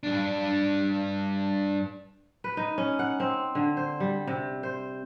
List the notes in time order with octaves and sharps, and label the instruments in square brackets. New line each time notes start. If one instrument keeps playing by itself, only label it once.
[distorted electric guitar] G2 D4
[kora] B4
D#4
C#4
F#5
C4
D3
C5
G3
C3
C5